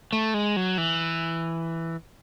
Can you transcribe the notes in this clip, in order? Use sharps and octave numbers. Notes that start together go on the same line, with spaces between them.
A3
G#3
F#3
E3